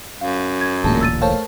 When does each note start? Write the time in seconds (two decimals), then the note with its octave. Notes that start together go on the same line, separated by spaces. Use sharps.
0.21 F#2 F5
0.61 G#6
0.84 D1 A1 A#2 G#3 A#3 A5
1.01 E6 A6 D#7
1.22 A3 A#4 C5 C#5 F5 A5